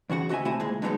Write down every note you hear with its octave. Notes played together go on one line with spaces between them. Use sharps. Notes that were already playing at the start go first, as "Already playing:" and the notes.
E2 C#3 F#4 F#5
D2 F#4 D#5 E5 G#5
C3 A3 E4 C5 G#5
D2 A#2 G#3
D3 F#3 G#3 A3 B3 D#4